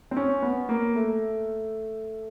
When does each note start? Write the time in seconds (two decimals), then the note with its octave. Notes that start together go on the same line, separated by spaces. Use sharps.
0.11 C4
0.17 C#4
0.42 B3
0.69 A#3
0.96 A3